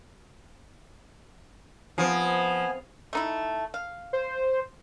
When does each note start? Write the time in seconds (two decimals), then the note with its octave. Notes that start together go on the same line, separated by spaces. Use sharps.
1.98 F3 B3 C4 G#4 G#5
3.13 A3 D#4 E4
3.74 F5
4.13 C5